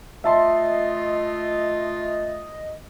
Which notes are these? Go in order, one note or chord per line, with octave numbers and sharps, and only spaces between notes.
A3 F4 D#5 E5 A5 C6